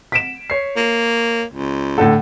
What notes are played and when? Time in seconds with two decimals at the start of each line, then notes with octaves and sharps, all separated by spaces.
0.12 B6 D7 E7
0.50 C#5 C7
0.77 A#3
1.53 C#2
1.98 A2 D3 A4 F#5